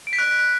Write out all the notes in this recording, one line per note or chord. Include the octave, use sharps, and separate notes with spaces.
D7
B6
F#6